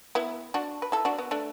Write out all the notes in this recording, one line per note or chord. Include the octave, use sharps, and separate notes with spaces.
B3 E4
D4 F#4
B4
E4 A4
D4 F#4
B3
A3 D4